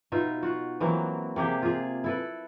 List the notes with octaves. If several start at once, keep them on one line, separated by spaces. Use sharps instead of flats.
B2 D#4 F4 E5
F4 F#4
E3 F#3 A#3 C4
C3 A#3 G4 G#4
F4 G#4
E4 A4 B4